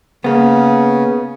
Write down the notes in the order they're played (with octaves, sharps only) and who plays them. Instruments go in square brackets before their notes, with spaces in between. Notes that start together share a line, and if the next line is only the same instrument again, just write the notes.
[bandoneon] C#3 [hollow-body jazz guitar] A#3 B3